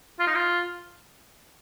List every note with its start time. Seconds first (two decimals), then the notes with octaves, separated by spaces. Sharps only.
0.19 F4
0.27 D#4
0.35 F4